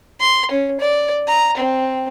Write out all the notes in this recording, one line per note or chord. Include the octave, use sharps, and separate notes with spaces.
C6
C#4
D5
A#5
C4